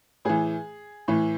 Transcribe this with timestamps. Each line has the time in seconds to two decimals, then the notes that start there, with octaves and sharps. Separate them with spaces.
0.25 A2 E3 G#4
1.08 A2 E3